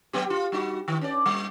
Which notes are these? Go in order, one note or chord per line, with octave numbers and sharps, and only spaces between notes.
F#3 B3 G4
F4
G3 D#4 F#4
D#3
C#4 D5
G3